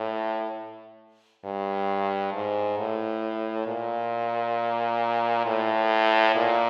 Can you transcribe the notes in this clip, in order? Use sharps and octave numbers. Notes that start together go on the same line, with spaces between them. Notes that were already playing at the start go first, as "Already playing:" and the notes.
Already playing: A2
G2
G#2
A2
A#2
A2
A#2